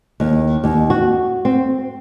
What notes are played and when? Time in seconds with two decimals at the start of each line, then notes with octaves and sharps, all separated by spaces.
0.20 D#2
0.64 D#2
0.90 F#4
1.45 C4